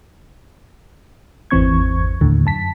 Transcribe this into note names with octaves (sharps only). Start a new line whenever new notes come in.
G#1 E2 E3 C4 C#6 G#6
D#2 A2 D3
F#2 A5 B6